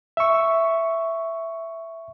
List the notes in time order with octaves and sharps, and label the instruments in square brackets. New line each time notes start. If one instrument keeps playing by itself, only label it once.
[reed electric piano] E5 C#6